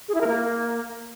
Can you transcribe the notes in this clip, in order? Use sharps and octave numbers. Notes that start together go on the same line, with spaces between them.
G#4
E4
A#4
A#3